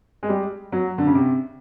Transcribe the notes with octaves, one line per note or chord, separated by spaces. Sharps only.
G#3
G3
F#3
D3
C#3
C3